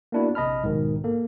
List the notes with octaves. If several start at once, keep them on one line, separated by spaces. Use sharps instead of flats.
A#3 B3 D4 E4 F#4
A#1 C3 D#5 A5 B5 F6
B1 G#2 B2 D#3
A#3 A4